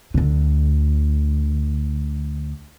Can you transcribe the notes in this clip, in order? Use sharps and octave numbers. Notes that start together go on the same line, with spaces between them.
D2 D3